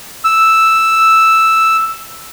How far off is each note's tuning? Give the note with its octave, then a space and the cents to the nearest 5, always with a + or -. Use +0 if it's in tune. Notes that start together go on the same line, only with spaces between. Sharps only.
E6 +0